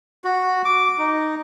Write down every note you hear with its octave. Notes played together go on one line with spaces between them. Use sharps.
F#4
D6
D#4